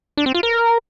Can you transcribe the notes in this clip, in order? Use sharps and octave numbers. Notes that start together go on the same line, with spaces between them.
D4
C4
F4
A#4